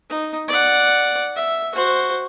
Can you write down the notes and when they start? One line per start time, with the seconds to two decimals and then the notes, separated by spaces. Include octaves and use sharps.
0.10 D#4
0.48 D5 F#5
1.36 E5
1.75 F#4 C5